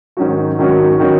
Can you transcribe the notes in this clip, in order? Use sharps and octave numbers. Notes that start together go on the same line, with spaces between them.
G#2 D#3 F#3 C#4 F#4
G#2 D#3 F#3 C#4 F#4
D#3 F#3 C#4 F#4